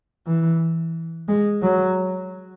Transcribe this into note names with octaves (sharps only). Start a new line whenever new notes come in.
E3
G#3
F#3